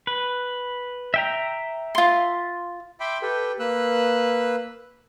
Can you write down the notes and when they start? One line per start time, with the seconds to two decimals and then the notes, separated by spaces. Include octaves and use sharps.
0.07 B4
1.14 E5 G5 A#5
1.95 F4 C6
3.00 E5 G5 B5 C6 D6
3.22 G4 A4 B4 G5
3.59 A#3 B4 E6 F#6